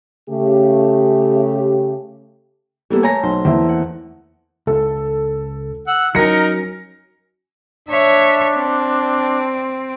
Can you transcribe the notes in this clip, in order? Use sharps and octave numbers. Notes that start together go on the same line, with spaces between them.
C#3 A3 G4
E3 G3 A#3 B3 A4 E5
A3 C#5 G#5 A#5 A#6
B1 C5
E2 A3 A#3 C4 E5
F#5
C#2 A4
F#5 E6
F#3 C#4 D#4 A#4 A#6 C#7
D4 C#5 E5
C4